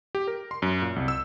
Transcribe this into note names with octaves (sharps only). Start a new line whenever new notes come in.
G4
A#4
C6
F#2
A#2
C2
E6